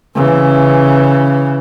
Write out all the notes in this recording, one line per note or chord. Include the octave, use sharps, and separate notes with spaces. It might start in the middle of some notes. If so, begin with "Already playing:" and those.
C#3 E3